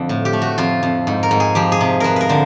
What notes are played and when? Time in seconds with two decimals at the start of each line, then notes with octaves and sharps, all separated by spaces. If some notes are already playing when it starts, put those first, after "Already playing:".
Already playing: F2 D3
0.09 A2
0.25 G4
0.33 A3
0.42 F#4
0.58 F2 F4
0.83 F2
1.07 G#2
1.23 A#4
1.31 G#2
1.40 G#4
1.55 F3 G4
1.72 G#4
1.81 C3
2.00 F3 A#4 B4
2.16 A#4 B4
2.29 D3 C5